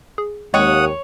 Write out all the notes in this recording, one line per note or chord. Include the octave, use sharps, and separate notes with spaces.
G#4
D#2 G#3 C4 C#5 F#5 D#6